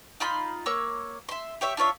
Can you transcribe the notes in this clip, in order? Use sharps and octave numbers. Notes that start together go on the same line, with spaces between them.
D#4 F4 B5 C6
A#3 C#5 E6
E5 C6
G4 C#5 E5
D4 F4 C#5 E5